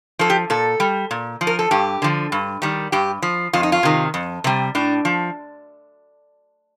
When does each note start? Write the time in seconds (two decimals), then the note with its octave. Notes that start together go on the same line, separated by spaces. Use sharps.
0.19 F3 A4
0.30 G4
0.50 A#2 A4
0.80 G3
1.11 A#2
1.41 F3
1.47 A#4
1.59 A4
1.71 G2 G4
2.02 D3 F3
2.32 G2
2.62 D#3 G3
2.92 G2 G4
3.22 F3
3.53 F2 F4
3.63 D#4
3.72 F4
3.83 C3 D#3
4.14 F2
4.44 C3 G3
4.75 A2 D4
5.05 F3